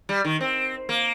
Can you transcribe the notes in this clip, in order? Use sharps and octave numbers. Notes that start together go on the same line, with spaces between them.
G3
D#3
C4
A#3